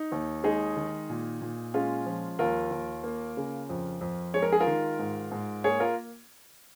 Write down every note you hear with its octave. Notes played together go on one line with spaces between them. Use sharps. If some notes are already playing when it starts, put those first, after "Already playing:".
Already playing: D#4
D#2
G#3 D#4 G#4
D#3
A#2
A#2
G#3 C#4 F4
F3
D#2 F4 A#4
D#2
A#3
C#3
F2
F2
G#3 C#5
A#4
G#4
F4 A#4
D#3
G#2
G#2
A#3 G#4 C#5
F4 A#4